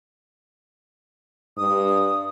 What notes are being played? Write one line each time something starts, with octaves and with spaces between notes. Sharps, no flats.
G2 D#6